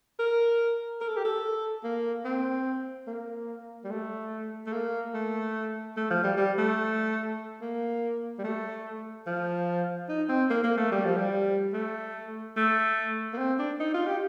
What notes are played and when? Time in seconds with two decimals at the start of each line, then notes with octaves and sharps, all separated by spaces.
0.19 A#4
1.01 A#4
1.09 A4
1.17 G4
1.25 A4
1.84 A#3
2.25 C4
3.07 A#3
3.84 G3
3.91 A3
4.66 A3
4.72 A#3
5.14 A3
5.97 A3
6.10 F3
6.23 G3
6.37 G3
6.58 A3
7.61 A#3
8.38 G3
8.44 A3
9.27 F3
10.09 D#4
10.29 C4
10.50 A#3
10.63 A#3
10.77 A3
10.92 G3
11.05 F3
11.17 G3
11.73 A3
12.56 A3
13.33 A#3
13.38 C4
13.59 D4
13.80 D#4
13.94 F4
14.07 G4